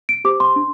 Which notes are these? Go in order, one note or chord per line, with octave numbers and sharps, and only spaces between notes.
D7
G4 C5 D6
C6
D4